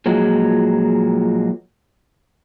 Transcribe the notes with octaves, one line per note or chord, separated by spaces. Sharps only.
A#2 F3 F#3 G#3